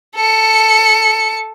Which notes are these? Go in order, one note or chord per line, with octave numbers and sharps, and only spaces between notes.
A4 C#7